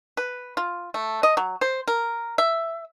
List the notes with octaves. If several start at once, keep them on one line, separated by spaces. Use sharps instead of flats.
B4
F4
A3
D#5
F#3
C5
A#4
E5